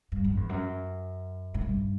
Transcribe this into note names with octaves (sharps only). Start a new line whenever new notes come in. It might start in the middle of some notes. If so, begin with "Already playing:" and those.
G2
F#2
E2
F#2
A2
G2